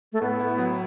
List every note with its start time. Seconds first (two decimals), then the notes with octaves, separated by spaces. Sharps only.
0.13 A3
0.22 A2 B3
0.40 E4
0.58 F#3